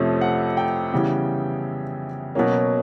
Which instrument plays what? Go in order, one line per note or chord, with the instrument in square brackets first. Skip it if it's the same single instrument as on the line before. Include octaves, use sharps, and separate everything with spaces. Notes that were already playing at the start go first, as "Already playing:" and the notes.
Already playing: [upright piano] F2 C3 F3 A3 C#4
F#5
G5
C#3 E3 G3 B3
B2 F#3 A#3 C#4